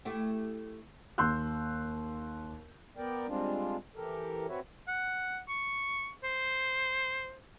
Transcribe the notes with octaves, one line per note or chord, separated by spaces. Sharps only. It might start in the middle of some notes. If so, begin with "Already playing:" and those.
A3 E4 G4
D#2 C6 E6 F#6 G6
B3 A#4 D5 G5
G3 G#3 C4 D4 F4
E3 G4 A4 A#4
C4 F#4 B4 C#5 E5
F#5
C#6
C5